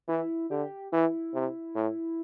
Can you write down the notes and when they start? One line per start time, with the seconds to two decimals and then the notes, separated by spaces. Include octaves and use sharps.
0.08 E3 E4
0.51 D3 G4
0.92 E3 E4
1.34 C3
1.75 A2